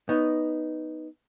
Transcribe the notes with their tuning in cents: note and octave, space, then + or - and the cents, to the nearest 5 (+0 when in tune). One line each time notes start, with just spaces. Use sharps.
B3 +0 D#4 +0 C#5 +0